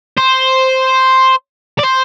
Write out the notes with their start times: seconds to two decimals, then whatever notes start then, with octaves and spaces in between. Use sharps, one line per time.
0.17 C5
1.79 D5
1.84 C5